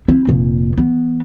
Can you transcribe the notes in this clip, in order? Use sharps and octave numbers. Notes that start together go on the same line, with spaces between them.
C4 E4
F1 A#2
E3 B3